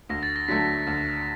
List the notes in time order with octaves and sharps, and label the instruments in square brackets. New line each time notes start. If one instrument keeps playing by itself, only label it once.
[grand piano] D2 [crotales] A#6
[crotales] A6
A#6
[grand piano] D3 F#3 A3 [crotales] B6
[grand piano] D2